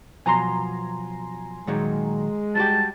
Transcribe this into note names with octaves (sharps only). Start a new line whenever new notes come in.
B2 F3 F#3 G#5 A#5 C6
A#2 D#3 F#3 G#3
G3 F#4 G4 A5